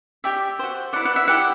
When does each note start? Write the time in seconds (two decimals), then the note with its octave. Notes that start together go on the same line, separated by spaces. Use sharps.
0.24 G4 D5 E5 G5
0.59 F#4 C5
0.93 E4 B4 D5 F#5
1.05 F#5
1.16 E5
1.28 E4 G4 D5 F#5